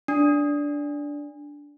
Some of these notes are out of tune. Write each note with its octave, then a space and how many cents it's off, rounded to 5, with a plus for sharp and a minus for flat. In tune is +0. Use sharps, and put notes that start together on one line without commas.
D4 -10